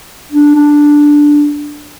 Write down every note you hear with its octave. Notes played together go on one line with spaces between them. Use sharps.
D4
D4